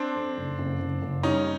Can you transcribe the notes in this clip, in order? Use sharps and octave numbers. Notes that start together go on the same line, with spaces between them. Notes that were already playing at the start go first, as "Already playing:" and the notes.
Already playing: C4 D4
F2
F#1
F#1
F#1
F#1
G3 C#4 D#4